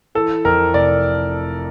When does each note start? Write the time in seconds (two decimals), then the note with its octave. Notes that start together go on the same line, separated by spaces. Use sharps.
0.15 E3 A4
0.45 F2 A#4
0.74 F1 D5